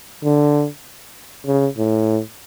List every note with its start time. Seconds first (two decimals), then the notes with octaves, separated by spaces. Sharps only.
0.24 D3
1.46 C#3
1.77 A2